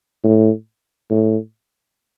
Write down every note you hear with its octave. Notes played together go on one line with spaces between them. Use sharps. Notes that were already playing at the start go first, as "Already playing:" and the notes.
A2
A2